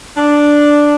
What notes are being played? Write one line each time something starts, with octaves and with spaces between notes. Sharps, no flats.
D4